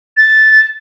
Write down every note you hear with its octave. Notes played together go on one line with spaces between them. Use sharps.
A6